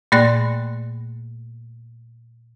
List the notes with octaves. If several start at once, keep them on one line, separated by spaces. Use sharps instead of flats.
A#2 A3 A#3 D5 C6 F#6